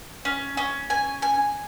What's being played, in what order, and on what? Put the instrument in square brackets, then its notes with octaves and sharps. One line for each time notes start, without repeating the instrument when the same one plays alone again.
[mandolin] C#4
C#4
G#5
G#5